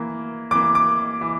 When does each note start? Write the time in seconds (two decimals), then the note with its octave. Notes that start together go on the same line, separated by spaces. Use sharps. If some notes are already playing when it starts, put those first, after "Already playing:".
Already playing: E3 A#3
0.51 E3 A#3 D6
0.75 D6
1.21 E3